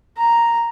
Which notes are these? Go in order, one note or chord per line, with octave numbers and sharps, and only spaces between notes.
A#5